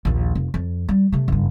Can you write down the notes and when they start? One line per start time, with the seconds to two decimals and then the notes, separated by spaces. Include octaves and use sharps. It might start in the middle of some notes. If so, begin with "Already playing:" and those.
0.05 A#1 D#2
0.35 F1
0.54 F2
0.89 G3
1.12 C3 A3
1.28 F#1 G2